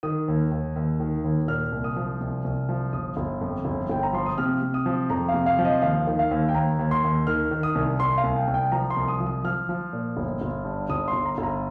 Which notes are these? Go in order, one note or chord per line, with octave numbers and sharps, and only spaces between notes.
D#3 D#6
D#2
D#2
D#2
D#3
D#2
A#2 F6
C2
D#6
F3
C2
C2
F3
G1 D#6
G1
F2
G1
G1 G5
A#5
F3 C6
D#6
C3 F6
C3
D#6
F3
F2 A#5
F5
C3
F5
F3
D#5
D#2 F5
D#3
F5
D#2
G5
D#2 A#5
D#2
C6
D#2
D#3 F6
D#3
D#6
C2
C2 C6
F5
C2
G5
C2
G5
F3 A#5
C6
C2
D#6
F3
D#6
F3 F6
F3
A#2
G1
G1
G2
G1 D#6
C6
G1
A#5
G1
A#5